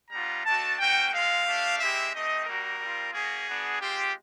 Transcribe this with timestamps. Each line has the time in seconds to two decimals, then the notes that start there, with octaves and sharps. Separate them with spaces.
0.11 G3 B3 D4 F4 A#5
0.45 A3 D4 F#4 A5
0.79 A#3 C#4 F#4 G5
1.12 G#3 C4 F4 F5
1.45 A3 D4 G4
1.79 G#3 C4 E4 G4 E5
2.12 A3 C4 D#4 G4 D#5
2.46 G3 A#3 D#4 F#4 A#4
2.79 G3 C4 F4
3.14 A#3 C#4 F#4 G#4
3.47 B3 D4 F#4
3.80 G#3 C4 F4 G4